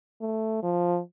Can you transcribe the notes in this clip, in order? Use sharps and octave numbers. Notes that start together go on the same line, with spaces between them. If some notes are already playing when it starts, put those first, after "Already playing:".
A3
F3